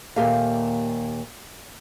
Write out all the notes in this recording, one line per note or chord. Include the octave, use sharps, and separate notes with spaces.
D#2 A#2 G4 A4 E5 F5